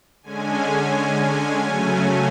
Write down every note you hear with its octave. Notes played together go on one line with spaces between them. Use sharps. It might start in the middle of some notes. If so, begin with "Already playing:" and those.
D3 G#3 C#4 G#5
C#3 F#3 A3 C#4